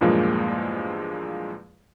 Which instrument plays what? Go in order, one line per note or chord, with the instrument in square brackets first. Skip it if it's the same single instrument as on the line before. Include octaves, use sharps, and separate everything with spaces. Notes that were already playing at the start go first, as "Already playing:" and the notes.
[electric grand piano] E2 G2 A#2 F3 G#3 A#3